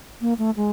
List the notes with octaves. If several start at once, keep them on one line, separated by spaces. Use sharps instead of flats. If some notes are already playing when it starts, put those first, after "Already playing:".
A#3
A3
G#3